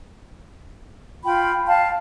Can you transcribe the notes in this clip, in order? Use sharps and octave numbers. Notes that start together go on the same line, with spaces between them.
F4 G5 B5
F5 A5